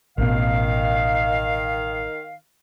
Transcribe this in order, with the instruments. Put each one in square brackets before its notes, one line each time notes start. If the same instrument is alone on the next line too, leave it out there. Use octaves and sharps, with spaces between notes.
[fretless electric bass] A1 B2 [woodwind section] D#3 F5